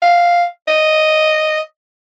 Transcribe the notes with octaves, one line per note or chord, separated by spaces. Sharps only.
F5
D#5